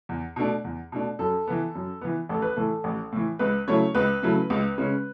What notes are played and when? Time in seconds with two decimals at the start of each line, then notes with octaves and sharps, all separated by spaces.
0.09 E2
0.36 B2 A3 D4
0.64 E2
0.92 B2 A3 D4
1.19 F#2 A4
1.47 E3 B3
1.75 F#2
2.01 E3 B3
2.29 A1 A4
2.42 B4
2.56 A2 E3 A4
2.84 A1
3.12 A2 E3
3.39 C#2 B4
3.67 C#3 F#3 A3 E4 C#5
3.95 C#2 B4
4.23 C#3 F#3 A3 E4
4.50 C#2
4.78 C#3 G#3 C#4